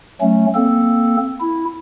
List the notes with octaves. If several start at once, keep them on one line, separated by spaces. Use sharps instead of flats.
F#3 A3 C#4
A#3 C4 A4
E4